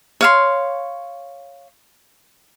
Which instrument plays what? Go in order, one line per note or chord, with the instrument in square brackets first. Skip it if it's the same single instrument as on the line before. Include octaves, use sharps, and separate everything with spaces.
[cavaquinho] C#5 F5 C6